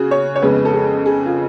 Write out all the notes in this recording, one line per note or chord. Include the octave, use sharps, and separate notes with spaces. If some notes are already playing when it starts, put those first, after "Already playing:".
Already playing: C#3 F#4 G#4
C#5
C#5
F2 C#3 G#3 B3 B4
A4
G#4
G#4
F4